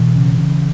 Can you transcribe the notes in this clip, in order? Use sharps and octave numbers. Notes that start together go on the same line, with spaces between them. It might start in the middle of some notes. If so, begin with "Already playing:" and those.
Already playing: B2 E3
C#3
C#3